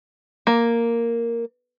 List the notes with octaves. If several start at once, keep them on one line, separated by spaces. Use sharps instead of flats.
A#3